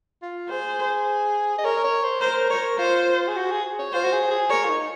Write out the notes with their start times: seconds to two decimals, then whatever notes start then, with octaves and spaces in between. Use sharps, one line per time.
0.22 F4
0.50 G#4 C5
1.58 D#5
1.65 A#4 C#5
1.84 C#5
2.03 C5
2.21 A#4 C5
2.50 A#4 C#5
2.78 F4 C5
3.28 G#4
3.36 F#4
3.51 G#4
3.79 C#5
3.93 F4 C5
4.04 F#4
4.12 G#4
4.31 G#4
4.50 A#4 C#5
4.64 F4
4.69 D#4